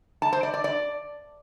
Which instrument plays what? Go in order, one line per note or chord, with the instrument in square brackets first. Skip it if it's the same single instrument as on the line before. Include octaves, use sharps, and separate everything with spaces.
[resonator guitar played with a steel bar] A5
C5
D5
D5
D5